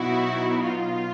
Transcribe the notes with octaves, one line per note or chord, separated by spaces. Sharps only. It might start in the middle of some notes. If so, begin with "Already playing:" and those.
Already playing: B2 F#3 B3 D#4 E4 F#4
F4